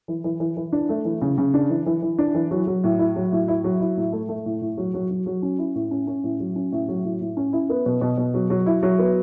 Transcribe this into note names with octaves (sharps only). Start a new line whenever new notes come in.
E3
E3
E3
E3
D4
A3
E3
C#3
C#3
D4
E3
E3
E3
D4
E3
F#3
F#3
A2
E4
F#3
A2
E4
F#3
E4
A2
A3
A3
A2
A2
F#3
F#3
F#3
F#3
C#4
E4
A2
C#4
C#4
A2
F#3
C#4
A2
F#3
A2
A2
C#4
E4
B3
B2
B2
B2
F#3
F#3
E4
F#3
B3